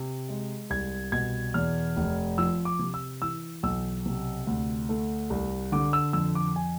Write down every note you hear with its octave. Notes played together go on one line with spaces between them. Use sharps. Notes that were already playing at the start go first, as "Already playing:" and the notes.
Already playing: C3
G#3
C2 G#6
B2 G#6
E2 F6
F1
F3 E6
D6
C3
E6
E3 E6
B1 E6
C3
D2
A3
C2
D3 D6
E6
F2 E6
D6
G#5